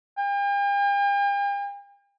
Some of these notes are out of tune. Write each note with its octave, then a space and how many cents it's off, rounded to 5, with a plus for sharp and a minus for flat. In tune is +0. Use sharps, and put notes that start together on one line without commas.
G5 +45